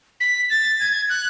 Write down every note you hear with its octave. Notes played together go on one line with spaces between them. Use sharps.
B6
A6
G#6
F#6